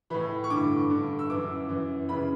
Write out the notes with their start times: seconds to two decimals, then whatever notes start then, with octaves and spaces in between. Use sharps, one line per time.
0.10 A2 E3 B5
0.44 C#6
0.50 G2 D3 D6
0.90 G2 D3
1.19 E6
1.30 F#2 E3 D6
1.69 F#2 E3
2.09 F#2 C#3 E3 B5